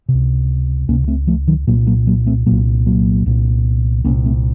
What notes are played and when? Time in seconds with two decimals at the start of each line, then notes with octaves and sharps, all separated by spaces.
0.09 C3
0.14 C#2
0.88 C#2 C3 A#3 C#4
1.08 A3 C4
1.27 F3 A3
1.48 D#3 F#3
1.67 C2 A#2 F#3 A#3
1.87 F#3 A#3
2.07 F#3 A#3
2.27 A3 C4
2.46 C2 A#2 F#3 A#3
2.86 F#3 A#3
3.26 C2 A#2
4.04 C2 A#3 C#4
4.10 A#2
4.25 A3 C4